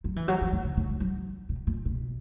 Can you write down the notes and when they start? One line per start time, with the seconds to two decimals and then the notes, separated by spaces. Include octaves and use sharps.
0.04 F#3
0.16 E3
0.28 F#3
0.41 E3
0.53 D#3
0.64 C#3
0.77 D#3
0.89 G#3
1.00 F#3
1.49 B2
1.67 A#2
1.85 B2